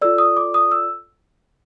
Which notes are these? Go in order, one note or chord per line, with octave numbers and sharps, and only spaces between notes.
F4 A4 D5 E6
D#6
D6
D#6
E6